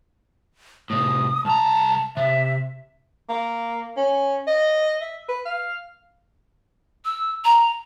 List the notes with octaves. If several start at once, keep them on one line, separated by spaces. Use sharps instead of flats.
A2 C3 D#6
C2 A5 A#5
C3 E5
A#3
C#4
D#5
E5
B4
F5
E6
A#5